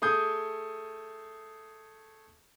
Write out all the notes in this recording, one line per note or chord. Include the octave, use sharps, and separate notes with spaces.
A3 G#4 D#6 G6